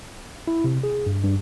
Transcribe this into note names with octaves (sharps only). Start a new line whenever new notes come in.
E4
C3
G#4
G2
G2